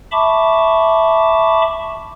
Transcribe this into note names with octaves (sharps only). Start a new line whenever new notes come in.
E5 A5 B5 C#6 D6